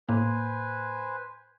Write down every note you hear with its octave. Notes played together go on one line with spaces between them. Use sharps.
A2 A#3 B4 C5 G#5